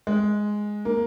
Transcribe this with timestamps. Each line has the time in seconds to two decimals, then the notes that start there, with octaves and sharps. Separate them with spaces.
0.07 G#3
0.85 A#3